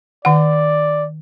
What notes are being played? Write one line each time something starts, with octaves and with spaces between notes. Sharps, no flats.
D#3 D5 F#5